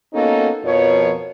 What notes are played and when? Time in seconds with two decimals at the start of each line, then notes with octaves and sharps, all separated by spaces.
0.14 A#3 B3 C#4 D#4 F#4 A4
0.64 F2 B2 F3 A#4 C#5